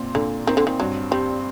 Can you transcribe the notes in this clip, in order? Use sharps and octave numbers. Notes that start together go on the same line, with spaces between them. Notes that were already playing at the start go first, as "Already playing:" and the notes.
Already playing: A#2 C4
A#2 D3
D#3 C4
D3
D#3
G2 F#3
G3 C4